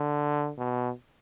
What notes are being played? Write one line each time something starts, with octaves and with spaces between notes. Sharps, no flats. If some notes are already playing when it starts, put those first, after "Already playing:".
Already playing: D3
B2